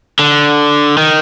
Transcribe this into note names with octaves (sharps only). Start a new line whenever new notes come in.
D3
D#3